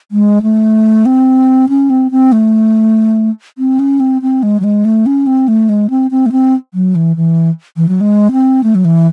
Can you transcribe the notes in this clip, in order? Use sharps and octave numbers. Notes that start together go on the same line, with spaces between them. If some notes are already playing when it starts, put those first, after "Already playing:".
G#3
A3
C4
C#4
C4
C4
A3
C4
C#4
C4
C4
G#3
F#3
G#3
A3
C#4
C4
A3
G#3
C4
C4
A3
C4
F#3
E3
E3
E3
F#3
G#3
C4
A3
F#3
E3